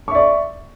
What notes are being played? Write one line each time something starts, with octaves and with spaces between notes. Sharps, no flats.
D5 E5 C#6